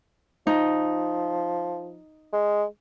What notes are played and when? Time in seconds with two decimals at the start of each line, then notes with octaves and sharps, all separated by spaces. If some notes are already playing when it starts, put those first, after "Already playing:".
0.47 F3 D#4
2.33 G#3